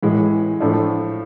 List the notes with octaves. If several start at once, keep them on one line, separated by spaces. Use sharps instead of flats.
A1 A2 E3 G#3
A2 F3 A3 D4 F4